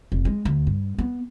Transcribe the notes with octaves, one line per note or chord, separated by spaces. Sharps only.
F1
G#3
D2
G2
B3